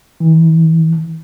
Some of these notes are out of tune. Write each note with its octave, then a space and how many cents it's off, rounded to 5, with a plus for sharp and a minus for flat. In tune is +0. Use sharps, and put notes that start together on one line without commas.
E3 -30